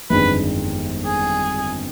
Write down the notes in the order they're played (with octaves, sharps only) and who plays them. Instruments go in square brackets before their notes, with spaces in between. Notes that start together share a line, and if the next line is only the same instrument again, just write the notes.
[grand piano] G1 F2 D#3 G#3 D4 [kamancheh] B4
[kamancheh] G#4